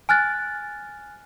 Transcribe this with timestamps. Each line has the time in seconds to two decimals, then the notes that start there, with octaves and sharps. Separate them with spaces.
0.09 G#5 F6 F#6 A6